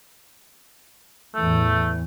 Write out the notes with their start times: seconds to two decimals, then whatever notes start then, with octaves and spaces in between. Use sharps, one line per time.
1.35 E2 A2 E3 A3